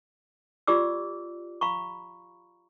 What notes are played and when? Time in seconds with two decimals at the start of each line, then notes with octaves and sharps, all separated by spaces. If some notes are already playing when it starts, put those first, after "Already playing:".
0.67 F4 G4 D5 D6 E6
1.61 F5 A#5 B5 C#6